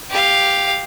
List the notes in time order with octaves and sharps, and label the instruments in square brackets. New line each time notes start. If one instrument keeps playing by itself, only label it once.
[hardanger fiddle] G4 F5